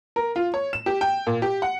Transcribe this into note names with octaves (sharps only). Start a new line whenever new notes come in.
A#4
F4
C#5
E7
G4
G5
A#2
G4
F#5